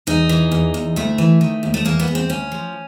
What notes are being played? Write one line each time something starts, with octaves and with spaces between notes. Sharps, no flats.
E2 D#4
E3
E2
E2
D2 A3
E3
D#3
D#2
A3
E2 A#3
B3
E2
C4
D2 C#4
F3